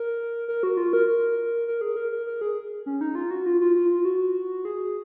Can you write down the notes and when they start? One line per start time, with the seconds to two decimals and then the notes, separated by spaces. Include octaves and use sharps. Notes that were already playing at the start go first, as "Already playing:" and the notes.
Already playing: A#4
0.48 A#4
0.63 F#4
0.77 F4
0.93 A#4
1.08 A#4
1.68 A#4
1.81 G#4
1.96 A#4
2.12 A#4
2.27 A#4
2.41 G#4
2.86 C#4
3.01 D#4
3.15 F4
3.31 F#4
3.46 F4
3.61 F4
3.75 F4
3.90 F4
4.05 F#4
4.65 G#4